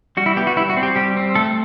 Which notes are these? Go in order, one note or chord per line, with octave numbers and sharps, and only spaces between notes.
G3 F#4
E4
B3 G4
F#4
G3 E4
F#4
C4
G4
G3 G4
C4
A3 A4